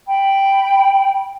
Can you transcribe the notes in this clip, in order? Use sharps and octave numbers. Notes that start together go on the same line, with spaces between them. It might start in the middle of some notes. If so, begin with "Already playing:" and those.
G5 B5